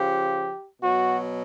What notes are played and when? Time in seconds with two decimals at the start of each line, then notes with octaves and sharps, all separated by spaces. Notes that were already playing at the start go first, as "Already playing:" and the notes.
Already playing: C#3 F3 G4
0.82 B2 F#3 F#4